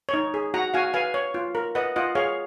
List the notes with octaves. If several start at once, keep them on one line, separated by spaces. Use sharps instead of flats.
D#4 C#5
G#4
F#4 F#5 A#5
F#4 F5 G#5
B4 F5 G#5
C#5
F4
A#4
B4 D#5 F#5
F4 D#5 F#5
G#4 C#5 F5